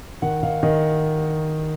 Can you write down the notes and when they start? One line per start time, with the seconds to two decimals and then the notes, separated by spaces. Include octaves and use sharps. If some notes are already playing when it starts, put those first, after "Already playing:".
0.22 D#3 F#5
0.43 D#3 F5
0.63 D#3 D#5